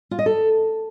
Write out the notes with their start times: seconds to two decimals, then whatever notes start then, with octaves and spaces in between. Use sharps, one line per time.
0.11 F4
0.19 D#5
0.26 A4